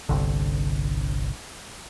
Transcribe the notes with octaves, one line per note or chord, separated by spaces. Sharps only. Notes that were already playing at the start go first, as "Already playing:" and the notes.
G1 C2 D3